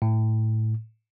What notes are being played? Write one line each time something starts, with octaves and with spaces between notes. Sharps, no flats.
A2